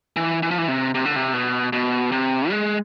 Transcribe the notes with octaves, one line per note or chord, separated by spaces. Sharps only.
E3
E3
F3
E3
C3
C3
D3
C3
B2
B2
C3
G#3